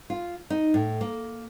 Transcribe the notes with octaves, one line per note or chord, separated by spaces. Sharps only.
F4
D#4
A2
A#3